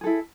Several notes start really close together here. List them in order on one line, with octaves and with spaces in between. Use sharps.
G#4 A4 E4